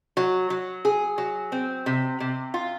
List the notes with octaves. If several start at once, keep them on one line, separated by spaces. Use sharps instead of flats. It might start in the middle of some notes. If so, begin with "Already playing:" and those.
F#3
F#3
G#4
F#3
C4
C3
C3
F4